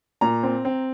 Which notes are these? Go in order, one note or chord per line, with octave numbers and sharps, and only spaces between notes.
A#2 A#5
C4
C4